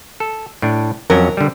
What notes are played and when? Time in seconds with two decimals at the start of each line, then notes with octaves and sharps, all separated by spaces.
0.20 A4
0.62 A2 D4
1.10 F2 F#3 C#4 A#4
1.37 D3 G3